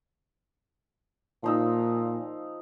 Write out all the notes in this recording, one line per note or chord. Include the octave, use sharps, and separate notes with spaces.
A#2 F3 D#4 E6